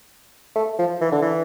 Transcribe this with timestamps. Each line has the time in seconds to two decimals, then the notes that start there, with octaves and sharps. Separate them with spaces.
0.55 A3
0.79 F3
1.01 E3
1.12 D3
1.22 E3